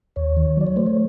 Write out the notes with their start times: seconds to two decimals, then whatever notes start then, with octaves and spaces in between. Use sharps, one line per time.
0.16 D#2 C#5
0.37 D#3
0.57 F#3 D5
0.67 C#5
0.76 A3 C5
0.87 C#5